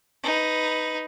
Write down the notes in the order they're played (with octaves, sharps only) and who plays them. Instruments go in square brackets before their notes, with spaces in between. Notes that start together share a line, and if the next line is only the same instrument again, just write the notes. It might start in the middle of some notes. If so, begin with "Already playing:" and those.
[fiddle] D#4 B4